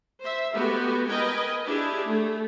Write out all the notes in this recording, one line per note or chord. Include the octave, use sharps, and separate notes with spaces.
C5 E5
G#3 A3 B3 F#4 G4
A#4 B4 D#5 G5 G#5
D4 E4 G4 G#4
A3